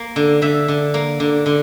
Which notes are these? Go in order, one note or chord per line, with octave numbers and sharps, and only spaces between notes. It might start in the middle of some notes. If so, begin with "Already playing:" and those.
Already playing: A#3
D3
D3 E5
D3
A#3
D3
D3